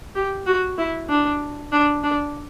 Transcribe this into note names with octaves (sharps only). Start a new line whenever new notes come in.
G4
F#4
E4
D4
D4
D4